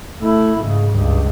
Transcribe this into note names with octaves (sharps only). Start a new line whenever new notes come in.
A3 E4
G#2 C#3
C#2 G2